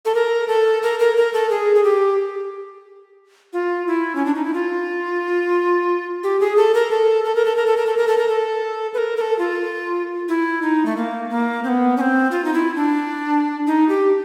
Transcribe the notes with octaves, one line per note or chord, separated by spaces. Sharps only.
A4
A#4
A4
A#4
A#4
A#4
A4
G#4
G#4
G4
F4
E4
C#4
D4
D#4
E4
F4
G4
G#4
A4
A#4
A4
A4
A#4
A4
A#4
A4
A#4
A4
A#4
A4
A#4
A4
B4
A#4
A#4
A4
F4
E4
D#4
A3
A#3
A#3
C4
B3
C#4
C4
F4
D#4
E4
D4
D#4
G4